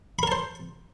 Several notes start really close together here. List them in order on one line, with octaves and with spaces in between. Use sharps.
B5 A#4 A5 C5